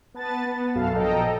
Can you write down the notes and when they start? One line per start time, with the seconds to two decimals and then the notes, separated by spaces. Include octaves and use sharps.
0.14 B3 B4 A5 A6
0.46 B3
0.75 B1 F#2 F#4 A4 F5 A5
0.95 A#1 A4 D#5 G5 A#5